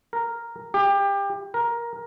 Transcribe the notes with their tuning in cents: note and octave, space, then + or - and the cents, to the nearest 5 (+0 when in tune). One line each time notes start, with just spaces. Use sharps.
A#4 +0
G4 +25
A#4 +15